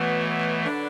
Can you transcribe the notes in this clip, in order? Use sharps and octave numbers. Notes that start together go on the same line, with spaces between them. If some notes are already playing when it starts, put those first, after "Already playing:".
Already playing: B2 E3 F#3 A3 B3
D3 F#3 D4 B4